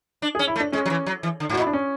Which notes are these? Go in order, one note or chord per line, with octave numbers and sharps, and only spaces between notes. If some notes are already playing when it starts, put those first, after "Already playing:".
D4
G#4
C#4
E4
A3
D4
G#3 C#4
F#3
E3
F#3
E3
D3
G#2
F#4
A2
E4
D4
C#4